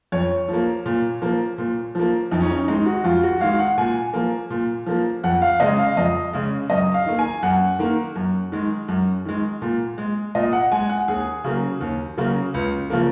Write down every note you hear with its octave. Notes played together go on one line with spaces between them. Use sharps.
F2 C#5
F3 A#3
A#2
F3 A#3
A#2
F3 A#3
F2 D#4
C#4
D#4
D#3 G#3 D#4
F#4
F2 F4
F#4
D#3 G#3 F5
F#5
A#2 G#5
F3 A#3
A#2
F3 A#3
F2 F#5
F5
C#3 G#3 D#5
F5
F2 D#5
C#3 G#3
F#2 D#5
F5
D#3 A#3
G#5
F#2 F#5
D#3 A#3
F#2
D#3 G#3
F#2
D#3 G#3
A#2
G#3
A#2 D#5
F#5
G#3 G#5
F#5
D#2 G#4
C#3 F#3 A#3
D#2
C#3 F#3 A#3
C#2
C#3 F3 A#3